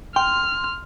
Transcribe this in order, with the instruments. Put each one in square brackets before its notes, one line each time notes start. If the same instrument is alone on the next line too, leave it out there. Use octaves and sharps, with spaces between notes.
[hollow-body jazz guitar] G5 [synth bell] C6 [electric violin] F6